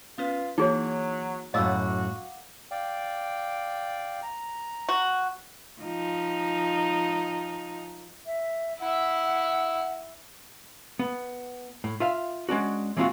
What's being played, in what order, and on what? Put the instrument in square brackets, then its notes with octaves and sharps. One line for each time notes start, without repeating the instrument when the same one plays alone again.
[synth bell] B3 C#4 B4 [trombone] F4
[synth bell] E3 A#3 E4 [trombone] F#3 [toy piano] D#4 G#4 C#5
[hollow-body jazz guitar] F#2 A2 [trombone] F#4 [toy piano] D#5 E6 [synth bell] F5 F#5 D6
[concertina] D5 F5 G5
A#5
[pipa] F#4
[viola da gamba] F3 D#4
[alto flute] E5
[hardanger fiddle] E4 E5 [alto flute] F#5
[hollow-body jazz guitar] B3
A2
F4 E5 F5
G#3 C#4 D4 F#4
E3 G#3 C4 D#4 F4 F#4